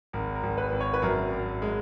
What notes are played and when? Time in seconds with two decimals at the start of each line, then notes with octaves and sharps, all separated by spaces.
0.13 G#1 A#4
0.35 A#4
0.43 G#1
0.58 B4
0.72 G#1
0.81 C#5
0.94 B4
1.02 F#2 A#4
1.32 G#1
1.62 G#3